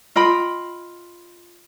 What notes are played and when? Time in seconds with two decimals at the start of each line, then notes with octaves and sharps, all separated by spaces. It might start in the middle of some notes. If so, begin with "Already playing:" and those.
0.16 F4 D#5 G5 B5